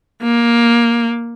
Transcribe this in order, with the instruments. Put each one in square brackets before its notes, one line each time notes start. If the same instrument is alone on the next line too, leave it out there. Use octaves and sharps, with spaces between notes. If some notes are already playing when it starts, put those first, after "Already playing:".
[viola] A#3